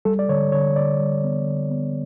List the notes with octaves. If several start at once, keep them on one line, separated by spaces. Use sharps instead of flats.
G3 A4
D5
D3 C#5
D3 C#5
D3 D5
G3
B3
D3
B3